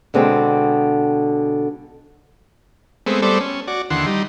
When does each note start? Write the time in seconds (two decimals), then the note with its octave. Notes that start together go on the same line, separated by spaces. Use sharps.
0.14 B2 D3 G#3 C4
3.07 G#3 A3 B3 C4
3.22 G3 A3 B3 A4 C5 D5
3.41 C#4
3.68 F#4 D5
3.90 D#2 D3 E3 F#5 C6
4.06 G3 D#4